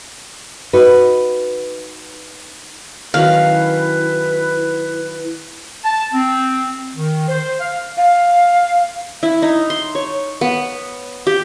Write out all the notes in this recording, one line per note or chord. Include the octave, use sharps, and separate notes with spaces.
D#4 F#4 B4
D#3 F#3 C#4 E4 B4 F5
A5
C4
D#3
C5
F5
F5
E4
D#4
C6
C#5
B3
G4